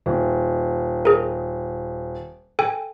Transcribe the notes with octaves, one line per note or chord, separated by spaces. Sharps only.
D#1
G#4 A#4
A4 G5 G#5